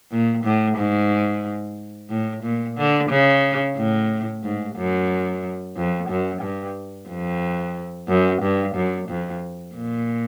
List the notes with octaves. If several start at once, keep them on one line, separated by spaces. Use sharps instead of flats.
A#2
A2
G#2
A2
A#2
D3
C#3
A2
G#2
F#2
F2
F#2
G2
F2
F#2
G2
F#2
F2
A#2